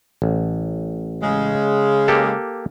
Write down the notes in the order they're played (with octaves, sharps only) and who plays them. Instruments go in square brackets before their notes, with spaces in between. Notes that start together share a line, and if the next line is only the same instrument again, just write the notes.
[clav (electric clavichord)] A1
[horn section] C#3 G#3
[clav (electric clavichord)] A#3 G4 A4